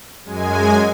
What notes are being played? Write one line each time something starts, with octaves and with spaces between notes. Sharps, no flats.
F#2 G#3 G#5